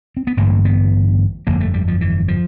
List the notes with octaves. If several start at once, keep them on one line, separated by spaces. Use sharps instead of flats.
C4
B3
A1 G2 D3 A#3
B3
G1 F2 D3 A#3
A3
G3
F3
E3
F3